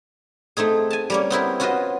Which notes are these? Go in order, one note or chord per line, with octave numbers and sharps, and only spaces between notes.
A3 C4 D#4 G#4
G#5 A5
G3 A#3 C#4
B3 C4 E4 A#4
C#4 F4 F#4 B4 C5 D#5